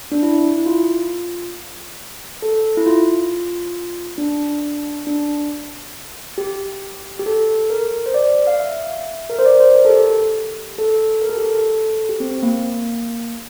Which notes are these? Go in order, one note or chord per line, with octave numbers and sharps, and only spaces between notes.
D4
E4
E4
F4
A4
E4
F4
D4
D4
G4
G4
A4
A#4
C5
D5
F5
E5
A#4
C5
D5
C5
A#4
A4
G4
A4
A#4
A4
G4
A4
G4
C4
C4
A#3